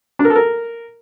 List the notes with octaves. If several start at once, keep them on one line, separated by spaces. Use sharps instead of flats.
D4
A#4
A4
A#4